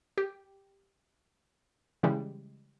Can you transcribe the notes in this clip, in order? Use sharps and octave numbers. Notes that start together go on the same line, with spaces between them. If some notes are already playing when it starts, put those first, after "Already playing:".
G4
C#3 E3 G3 G#3